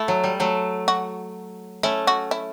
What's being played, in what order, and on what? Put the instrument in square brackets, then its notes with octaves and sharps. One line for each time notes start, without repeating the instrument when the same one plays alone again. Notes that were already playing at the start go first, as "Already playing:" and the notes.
Already playing: [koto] A3 [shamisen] E4
[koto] F#3
G3
F#3 A3
[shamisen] F#4
[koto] A3 C#4 [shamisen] E4
[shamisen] F#4
E4